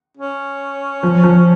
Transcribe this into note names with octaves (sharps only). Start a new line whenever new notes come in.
C#4
F3
F3